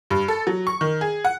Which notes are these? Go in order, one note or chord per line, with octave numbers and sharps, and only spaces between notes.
G2
A4
F#3
C#6
D#3
G#4
F#5